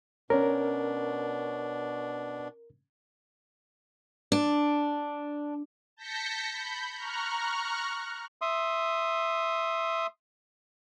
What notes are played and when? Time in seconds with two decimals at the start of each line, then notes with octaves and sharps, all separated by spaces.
0.30 B2 C#4 D4 A#4
4.32 D4
5.97 A5 G6 A#6 B6 C#7
6.53 B5 G6
6.96 A#5 C#6 F6 F#6
8.42 E5 C6 D#6